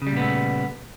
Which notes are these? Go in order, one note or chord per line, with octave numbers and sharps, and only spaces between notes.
A#2 C#3 G3 A3 B3